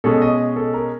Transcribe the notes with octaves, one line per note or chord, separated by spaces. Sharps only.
B2 G#3 C#4 A4
D#5
A4
A#4